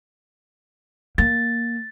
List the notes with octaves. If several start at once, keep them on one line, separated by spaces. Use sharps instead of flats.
A#3 A6